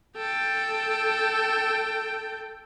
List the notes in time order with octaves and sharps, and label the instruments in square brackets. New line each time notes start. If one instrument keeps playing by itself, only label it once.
[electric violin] A4 G5